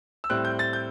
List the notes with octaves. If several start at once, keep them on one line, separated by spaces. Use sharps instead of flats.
E6
A2 G3 C4 F#6
G6
A6
G6